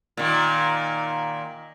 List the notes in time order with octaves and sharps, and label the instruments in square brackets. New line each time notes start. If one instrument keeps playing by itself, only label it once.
[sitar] A#2 D#3